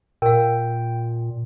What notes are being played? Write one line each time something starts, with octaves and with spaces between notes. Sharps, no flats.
A#2 A#4 F5 G5